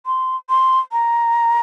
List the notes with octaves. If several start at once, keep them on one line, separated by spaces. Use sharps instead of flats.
C6
C6
A#5